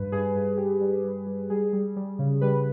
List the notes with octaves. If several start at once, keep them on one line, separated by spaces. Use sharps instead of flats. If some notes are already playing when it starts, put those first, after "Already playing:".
Already playing: G2 G3 B4
G2 G#4
G2
G2 G4
G3
G3
G3
G3 G#4
G3
G3
C#3
G3 B4